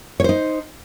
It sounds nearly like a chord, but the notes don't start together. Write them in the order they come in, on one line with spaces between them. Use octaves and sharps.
C#5 C5 D#4